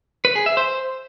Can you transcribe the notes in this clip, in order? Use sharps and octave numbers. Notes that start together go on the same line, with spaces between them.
B4
G#4
E5
C5